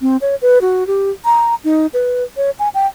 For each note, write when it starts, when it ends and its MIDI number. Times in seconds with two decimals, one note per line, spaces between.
0.01 0.17 60
0.21 0.35 73
0.42 0.58 71
0.61 0.86 66
0.87 1.11 67
1.25 1.55 82
1.64 1.87 63
1.94 2.24 71
2.37 2.51 73
2.59 2.69 80
2.74 2.87 79